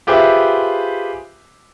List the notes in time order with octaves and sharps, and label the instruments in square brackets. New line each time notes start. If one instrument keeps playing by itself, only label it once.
[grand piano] F4 G4 G#4 B4 C5 E5